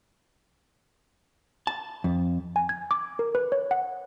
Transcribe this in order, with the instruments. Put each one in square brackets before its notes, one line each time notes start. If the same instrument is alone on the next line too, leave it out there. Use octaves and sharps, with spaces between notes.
[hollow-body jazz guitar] A5
F2
[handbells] G#5
G#6
D6
A#4
B4
C#5
F#5